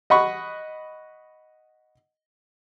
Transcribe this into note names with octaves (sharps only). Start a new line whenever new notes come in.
D#5 F#5 B5 C#6